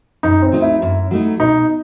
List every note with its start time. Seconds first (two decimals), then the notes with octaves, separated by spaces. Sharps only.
0.23 F#2 D#4
0.42 C4
0.52 F#3 A3 D#4
0.62 E4
0.82 F#2
1.11 F#3 A3 D#4
1.39 B2 D#4